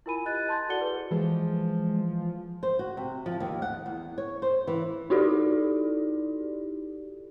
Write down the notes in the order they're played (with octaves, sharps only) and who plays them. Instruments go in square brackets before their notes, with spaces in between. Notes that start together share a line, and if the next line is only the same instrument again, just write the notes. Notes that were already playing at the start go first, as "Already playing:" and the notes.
[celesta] E4 F4 A#4 G#5 B5 D#7
G4 D#5 F#6 A6
E4 A5 C6 G6 A6
F#4 A4 D5 F#5 C#7 G7
G#4 B4
[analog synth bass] E3 [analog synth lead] F3 [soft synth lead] G#3
[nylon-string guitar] C5
F#4
C3
F3
D#2
F#5
E2
C#5
C5
E3
[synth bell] D#4 E4 F#4 G4 A4 D5